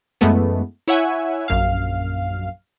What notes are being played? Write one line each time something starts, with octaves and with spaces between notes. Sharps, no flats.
F#2 E3 G#3 A3 B3
E4 C#5 E5 F#5 G#5
A#1 F#2 F5